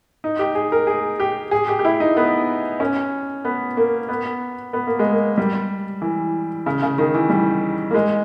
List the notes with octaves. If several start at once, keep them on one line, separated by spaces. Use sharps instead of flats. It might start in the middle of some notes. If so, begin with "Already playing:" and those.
D#4
G4
G#4
A#4
G#4
G4
G#4
G4
G4
E4
D#4
B3
C#4
B3
A#3
B3
B3
A#3
G#3
A#3
G3
E3
C#3
C#3
D#3
E3
G3
A#3
G#3